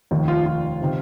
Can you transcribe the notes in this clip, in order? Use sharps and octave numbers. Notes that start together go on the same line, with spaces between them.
F1 D#2 D#3
F4
F4
C3 D#3